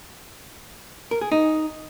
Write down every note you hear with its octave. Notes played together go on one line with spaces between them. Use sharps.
A#4
G#4
D#4